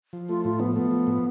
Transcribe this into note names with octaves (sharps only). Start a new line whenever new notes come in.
F3
A3 F4
A2 F4
F3 B3
A3 B3
F3
A2